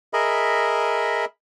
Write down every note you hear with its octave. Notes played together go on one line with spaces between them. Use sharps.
G#4 A#4 D#5 E5 B5